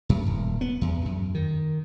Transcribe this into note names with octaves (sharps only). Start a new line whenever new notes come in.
F#2
D#1
B3
E2
F#2
D#3